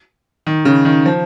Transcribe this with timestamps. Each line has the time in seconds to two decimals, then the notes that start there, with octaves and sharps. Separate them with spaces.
0.47 D#3
0.65 C#3
0.85 D#3
1.06 F3